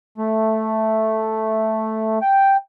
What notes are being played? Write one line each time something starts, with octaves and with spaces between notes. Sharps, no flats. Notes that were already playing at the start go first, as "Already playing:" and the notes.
A3
G5